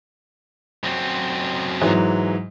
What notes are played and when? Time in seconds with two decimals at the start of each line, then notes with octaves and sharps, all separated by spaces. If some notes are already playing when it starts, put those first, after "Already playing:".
0.84 F#2 C4
1.81 G#2 E3 F#3